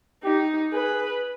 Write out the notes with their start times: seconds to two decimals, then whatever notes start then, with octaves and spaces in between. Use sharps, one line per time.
0.23 D#4 G4
0.72 G#4 B4